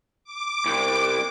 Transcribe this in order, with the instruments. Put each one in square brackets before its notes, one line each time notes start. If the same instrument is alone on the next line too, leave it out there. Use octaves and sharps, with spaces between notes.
[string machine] D6
[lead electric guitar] C2